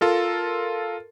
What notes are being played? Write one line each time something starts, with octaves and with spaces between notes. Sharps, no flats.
F4 A4 A#4